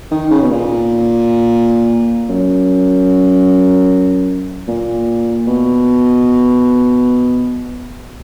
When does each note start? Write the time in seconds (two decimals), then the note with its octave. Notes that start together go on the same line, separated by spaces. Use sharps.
0.11 D#3
0.31 C#3
0.42 B2
0.51 A#2
2.29 F#2
4.68 A#2
5.47 B2